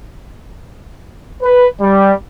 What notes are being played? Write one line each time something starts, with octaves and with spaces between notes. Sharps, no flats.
B4
G3